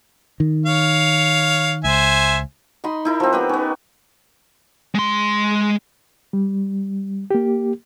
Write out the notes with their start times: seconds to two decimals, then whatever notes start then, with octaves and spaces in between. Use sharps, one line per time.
0.40 D#3
0.66 C#5 F5
1.84 C#2 C5 E5 G#5
2.84 D#4 D#5 B5 C6
3.05 D#4 E4 A#4
3.20 F3 C4
3.33 B3 G4 B4
3.49 B3 C#4
4.95 G#3 C6
6.33 G3
7.31 A#3 G4